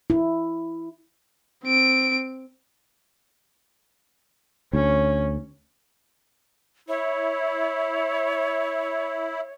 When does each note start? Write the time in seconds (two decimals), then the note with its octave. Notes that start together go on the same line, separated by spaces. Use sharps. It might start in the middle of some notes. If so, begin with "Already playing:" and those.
0.10 E4
1.64 C4 D7
4.73 D2 C#4
6.88 E4 C#5